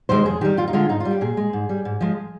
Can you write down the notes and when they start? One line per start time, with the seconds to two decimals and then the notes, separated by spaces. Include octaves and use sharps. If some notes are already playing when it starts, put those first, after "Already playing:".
0.09 C3 D#3 G#3 C5
0.25 F2 G#4
0.41 D#3 G3 G4
0.57 F2 F4
0.68 D#4
0.73 D3 G#3 F4
0.89 G#2 D#4
1.00 F4
1.05 G3
1.11 G4
1.21 A#2 G#4
1.37 G#3
1.53 G#2
1.69 G3
1.85 G#2
2.01 F3 G#3